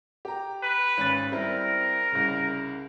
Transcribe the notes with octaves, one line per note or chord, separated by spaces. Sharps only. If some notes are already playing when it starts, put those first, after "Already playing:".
G4 A#5
B4
G#1 C#4 A6
G3 C4 E4 A#4
C2 C#3